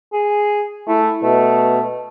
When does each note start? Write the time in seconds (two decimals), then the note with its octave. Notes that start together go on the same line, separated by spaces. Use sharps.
0.13 G#4
0.88 A3 E4
1.23 B2 A3